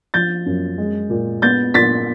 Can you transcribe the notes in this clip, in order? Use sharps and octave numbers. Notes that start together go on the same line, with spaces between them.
F3 G6 A6
F#2
G#3
A#2
B3 G6 A6
A#2 A6 B6